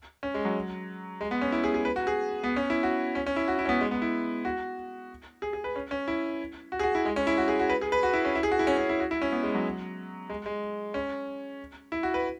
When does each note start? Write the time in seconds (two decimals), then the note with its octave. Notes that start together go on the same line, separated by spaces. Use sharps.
0.23 C#4
0.34 G#3
0.45 F#3
1.21 G#3
1.31 B3
1.41 C#4
1.52 E4
1.64 G#4
1.74 G#4
1.85 B4
1.96 F#4
2.07 G#4
2.44 B3
2.56 C#4
2.70 E4
2.83 F#4
3.15 C#4
3.26 C#4
3.36 E4
3.48 F#4
3.59 E4
3.65 C#4
3.69 B3
3.81 G#3
3.91 B3
4.02 E4
4.45 F#4
5.42 G#4
5.53 G#4
5.64 B4
5.76 C#4
5.91 C#4
6.08 E4
6.72 F#4
6.79 G#4
6.83 F#4
6.95 E4
7.05 G#3
7.16 C#4
7.27 E4
7.38 F#4
7.48 G#4
7.60 F#4
7.69 B4
7.81 G#4
7.92 B4
8.03 F#4
8.13 E4
8.25 C#4
8.35 E4
8.43 G#4
8.51 F#4
8.59 E4
8.67 C#4
8.78 C#4
8.89 E4
9.00 F#4
9.11 E4
9.22 C#4
9.32 B3
9.43 G#3
9.55 F#3
10.30 G#3
10.46 G#3
10.94 C#4
11.92 E4
12.03 F#4
12.14 B4